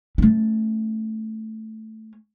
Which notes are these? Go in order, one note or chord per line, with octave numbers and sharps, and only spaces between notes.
A3 C#4